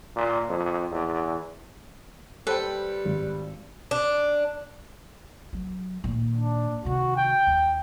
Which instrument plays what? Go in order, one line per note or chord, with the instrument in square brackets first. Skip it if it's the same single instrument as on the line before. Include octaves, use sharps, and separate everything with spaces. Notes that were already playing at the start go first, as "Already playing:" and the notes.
[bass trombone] A#2
F2
E2
[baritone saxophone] G3 [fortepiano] A4 G5 [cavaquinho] B4 [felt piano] C5
[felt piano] G#1
[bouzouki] D4
[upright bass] F#3
A#2 D#3
[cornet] D4
[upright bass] C3 D#3 [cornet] F#4
[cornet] G5
[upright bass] D#2